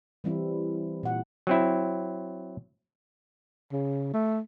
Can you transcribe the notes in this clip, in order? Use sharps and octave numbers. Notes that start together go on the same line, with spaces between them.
E3 G3 C4 E4
A#2 F#5
F#3 C4 E4
C#3
A3